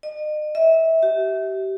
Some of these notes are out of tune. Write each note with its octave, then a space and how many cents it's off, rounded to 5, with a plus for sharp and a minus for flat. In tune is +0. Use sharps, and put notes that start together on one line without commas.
D#5 -40
E5 -25
G4 -35